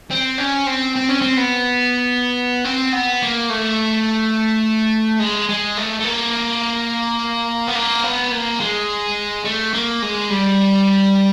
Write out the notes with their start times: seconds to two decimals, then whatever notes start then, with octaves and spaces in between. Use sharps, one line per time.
0.10 C4
0.38 C#4
0.67 C4
0.96 C4
1.09 C#4
1.21 C4
1.37 B3
2.65 C4
2.93 B3
3.22 A#3
3.50 A3
5.20 G#3
5.49 G#3
5.77 A3
6.00 A3
6.05 A#3
7.67 B3
7.75 A#3
8.04 B3
8.32 A#3
8.60 G#3
9.45 A3
9.74 A#3
10.02 G#3
10.30 G3